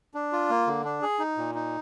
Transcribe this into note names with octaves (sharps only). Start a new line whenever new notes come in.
D4
F4
A#3
D3
D4
G#4
D#4
A#2
D#4